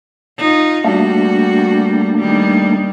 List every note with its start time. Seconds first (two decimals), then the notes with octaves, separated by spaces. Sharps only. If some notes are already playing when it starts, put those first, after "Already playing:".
0.38 D#4 F4
0.85 G3 A3 A#3 D4 F#4
2.18 D#3 G3